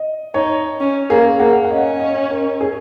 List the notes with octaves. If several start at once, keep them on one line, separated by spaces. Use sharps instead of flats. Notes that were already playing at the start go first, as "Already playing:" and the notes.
Already playing: D#5
D#4 C#5
C#4
A#3 G#4
A#3 F#5
F#5
C#4 D#5
D#5
A#4
G#4